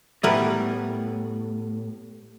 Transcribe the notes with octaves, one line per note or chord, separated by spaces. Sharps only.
A2 G3 B3 E4 A#4 B4